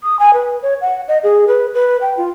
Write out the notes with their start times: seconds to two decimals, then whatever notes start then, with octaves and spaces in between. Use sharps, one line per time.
0.03 D#6
0.19 G#5
0.33 B4
0.62 C#5
0.81 F#5
1.08 D#5
1.23 G#4
1.48 B4
1.74 B4
2.01 G5
2.17 F4